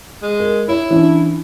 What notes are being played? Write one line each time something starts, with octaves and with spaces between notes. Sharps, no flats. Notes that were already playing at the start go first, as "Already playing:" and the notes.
G#3
A#4
E4 C#5
E3 C#4 D4